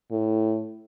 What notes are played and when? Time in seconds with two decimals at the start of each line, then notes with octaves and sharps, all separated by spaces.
0.11 A2